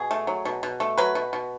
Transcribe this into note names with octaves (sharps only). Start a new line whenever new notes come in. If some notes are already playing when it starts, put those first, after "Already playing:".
Already playing: B2 G#4
A3
F#3
B2
B2
A3
F#3 B4
B2
B2